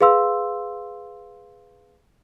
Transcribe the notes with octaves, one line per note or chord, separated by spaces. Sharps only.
G#4 B4 F5 C6 E6